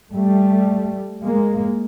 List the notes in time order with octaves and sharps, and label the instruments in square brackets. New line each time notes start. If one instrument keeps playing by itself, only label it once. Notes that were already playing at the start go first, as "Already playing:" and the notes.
[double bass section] G3 A3
G#3 A#3